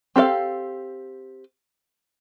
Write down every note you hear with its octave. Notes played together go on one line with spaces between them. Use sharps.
C4 G4 A4 F5